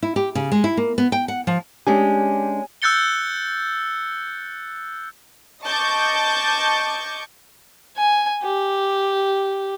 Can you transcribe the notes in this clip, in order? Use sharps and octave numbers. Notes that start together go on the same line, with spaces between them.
E4
G4
C#3
G#3
E4
A#3
B3
G5
F#5
F3
G#3 C#4 D4 G4 G#5
E6 F#6 G6 A6 C#7 G7
D#5 A5 C#6 D6 G6
G#5
G4